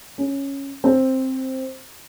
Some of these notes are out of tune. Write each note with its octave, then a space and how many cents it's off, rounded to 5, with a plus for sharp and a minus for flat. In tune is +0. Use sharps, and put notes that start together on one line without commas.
C#4 -5
C4 +5